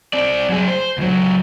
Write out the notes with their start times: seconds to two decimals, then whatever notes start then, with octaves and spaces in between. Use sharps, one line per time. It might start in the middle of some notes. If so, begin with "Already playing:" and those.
0.13 C4 D5
0.49 F#3 G#4
0.68 C5
0.98 C#2 F#3